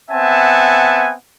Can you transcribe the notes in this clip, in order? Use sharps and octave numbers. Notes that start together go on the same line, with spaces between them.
B3 C4 E5 F#5 G#5 A5